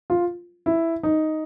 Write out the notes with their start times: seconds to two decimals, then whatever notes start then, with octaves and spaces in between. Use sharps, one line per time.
0.10 F4
0.66 E4
1.03 D#4